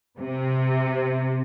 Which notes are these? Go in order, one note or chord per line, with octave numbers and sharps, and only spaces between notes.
C3